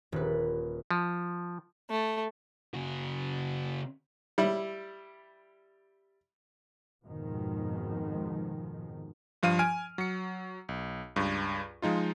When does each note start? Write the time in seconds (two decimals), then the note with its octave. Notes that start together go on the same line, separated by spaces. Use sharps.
0.12 D#1 B4
0.91 F3
1.90 A3
2.74 C#3 F#4
4.38 G3 E4
7.05 F2 G#2 B2 D#3 F3 G#3
9.43 G2 F3 F5 D#7
9.59 G#5 F6 D7
9.98 F#3 C#7
10.69 B1
11.16 C#2 G2
11.82 F3 G#3 D#4 F4